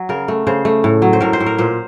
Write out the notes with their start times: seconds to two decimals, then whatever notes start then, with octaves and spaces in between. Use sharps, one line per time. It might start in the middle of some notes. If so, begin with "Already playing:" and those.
Already playing: F#3
0.09 C#3 A#4
0.28 A3
0.47 C#3 C5
0.65 A3
0.84 A2
1.02 F#3
1.13 C5
1.21 A2 A#4
1.33 C5
1.40 A2
1.46 A#4
1.58 A#2 C5